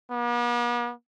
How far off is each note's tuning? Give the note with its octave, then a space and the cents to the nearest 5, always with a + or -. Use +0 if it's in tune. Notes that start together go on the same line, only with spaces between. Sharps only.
B3 -45